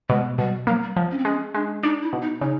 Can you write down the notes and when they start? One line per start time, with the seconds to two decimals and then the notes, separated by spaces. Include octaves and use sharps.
0.09 B2 G#3
0.38 B2 G3
0.67 F#3 A#3
0.82 G3
0.96 F3
1.11 C#4
1.19 C4
1.25 G#3 C#4
1.55 G#3 D4
1.83 D4 D#4
2.02 E4
2.13 B2
2.22 D#4
2.41 C#3 D#4